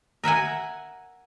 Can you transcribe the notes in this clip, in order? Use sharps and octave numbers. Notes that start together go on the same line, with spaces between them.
A#4 E5 F#5 G#5